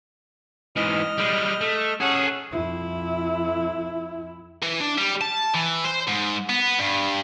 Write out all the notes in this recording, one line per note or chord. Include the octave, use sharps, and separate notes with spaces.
G#2 E3 D#5 F6
G3 G#3
A3
C#4 G#4 A4 F#5 D#6
F2 E4
E3
D4
G3
A5
E3
C5
G#2
B3
G2